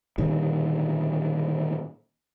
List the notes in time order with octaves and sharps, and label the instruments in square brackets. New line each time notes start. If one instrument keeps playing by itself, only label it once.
[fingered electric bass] A#2 D3 D#3 G3